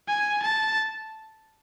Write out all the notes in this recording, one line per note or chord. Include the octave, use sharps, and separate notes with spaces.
G#5
A5